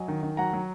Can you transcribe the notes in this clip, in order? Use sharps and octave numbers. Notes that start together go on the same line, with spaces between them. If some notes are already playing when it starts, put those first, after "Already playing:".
Already playing: F#3 D#5 G#5
D#3
D#3
F#3 F#5 A#5
F#3